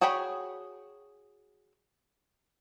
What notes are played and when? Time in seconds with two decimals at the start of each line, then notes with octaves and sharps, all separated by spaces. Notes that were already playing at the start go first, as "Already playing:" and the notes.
0.01 F#4 G#4 C#5 G5 B5